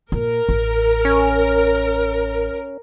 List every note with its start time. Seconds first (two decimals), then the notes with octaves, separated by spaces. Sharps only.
0.12 A#2 A#4
0.49 A1
1.05 C#4